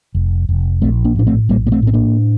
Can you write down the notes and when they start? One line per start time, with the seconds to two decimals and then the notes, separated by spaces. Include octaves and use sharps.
0.15 F1
0.49 F1
0.82 A#1 A3 C4
1.05 A#3 D4
1.16 A2 D4
1.27 A3 C4
1.49 A#1 G3 A#3
1.67 A#3
1.72 A3 C4
1.82 A2 C4
1.93 A#3 D4